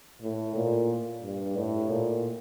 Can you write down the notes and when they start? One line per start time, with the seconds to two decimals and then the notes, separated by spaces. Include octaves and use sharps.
0.22 A2
0.55 A#2
1.22 G2
1.56 A2
1.90 A#2